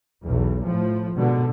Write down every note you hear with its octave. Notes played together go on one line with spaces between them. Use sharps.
B1 E2
A2 F3
G#2 B2 D3